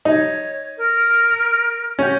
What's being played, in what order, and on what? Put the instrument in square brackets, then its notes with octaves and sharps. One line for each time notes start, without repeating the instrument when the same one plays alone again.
[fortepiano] D#4 [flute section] C#5
[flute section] A#4
[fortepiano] C#4 [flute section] F#4 G4